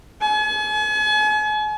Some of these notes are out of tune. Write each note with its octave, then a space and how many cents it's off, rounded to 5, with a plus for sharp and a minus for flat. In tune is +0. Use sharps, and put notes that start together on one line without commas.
G#5 +40